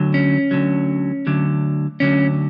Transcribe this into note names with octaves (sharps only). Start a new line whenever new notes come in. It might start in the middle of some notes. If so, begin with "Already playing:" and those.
Already playing: D2 D3 F#3
C#4
D2 D3 F#3
D2 D3 F#3
D2 D3 F#3 C#4